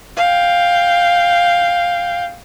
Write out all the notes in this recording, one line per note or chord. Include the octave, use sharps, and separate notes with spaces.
F5 G5